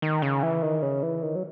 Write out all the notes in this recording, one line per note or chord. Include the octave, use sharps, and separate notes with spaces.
D#3
C#3
E3
D#3
C#3
E3
D#3
F#3